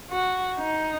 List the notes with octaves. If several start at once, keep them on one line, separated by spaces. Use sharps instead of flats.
F#4
D#4